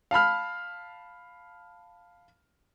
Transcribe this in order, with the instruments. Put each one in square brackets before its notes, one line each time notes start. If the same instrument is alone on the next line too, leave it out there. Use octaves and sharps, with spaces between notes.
[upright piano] F5 A5 B5 F6